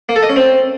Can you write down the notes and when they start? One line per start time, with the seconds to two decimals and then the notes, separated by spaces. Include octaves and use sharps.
0.09 A#3
0.16 A4
0.23 D#5
0.29 C#4
0.36 C4